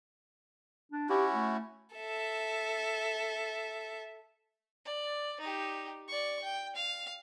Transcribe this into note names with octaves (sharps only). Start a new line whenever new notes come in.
D4
C#4 E4 F#4 G4
A3
A4 E5
D5
D#4 G4
D5 C#6
G5
F5